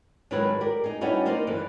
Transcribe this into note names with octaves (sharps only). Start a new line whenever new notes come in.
G#2 D#3 F#3 G#3 G#4 B4
G4 A#4 D5
D#4 G#4
G3 B3 C#4 D#4 E4 F#4
A#3 D#4 A#4 C5 D5
G2 D3 E3